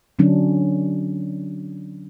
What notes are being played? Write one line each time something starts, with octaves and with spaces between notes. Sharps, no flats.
D3 F#3 C#4 D4